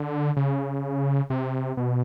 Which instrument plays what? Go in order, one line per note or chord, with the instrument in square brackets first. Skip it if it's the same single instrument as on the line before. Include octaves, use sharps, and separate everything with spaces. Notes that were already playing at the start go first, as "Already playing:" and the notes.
Already playing: [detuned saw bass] D3
C#3
C3
B2